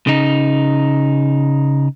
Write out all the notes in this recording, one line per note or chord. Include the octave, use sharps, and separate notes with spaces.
C#3 D#4